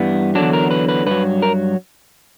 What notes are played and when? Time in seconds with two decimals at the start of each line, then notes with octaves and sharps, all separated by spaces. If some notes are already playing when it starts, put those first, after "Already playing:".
Already playing: G2 E3 G3 B3
0.35 E2 D3 F#3 D4
0.53 A#4
0.71 B4
0.89 B4
1.06 G2 F#3 B4
1.42 A#4